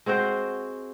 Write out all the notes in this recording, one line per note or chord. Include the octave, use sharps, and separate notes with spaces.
G#3 C4 F#4 C5